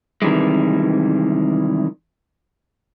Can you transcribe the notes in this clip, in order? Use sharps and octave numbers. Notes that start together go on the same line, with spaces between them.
C3 D#3 E3 G3 G#3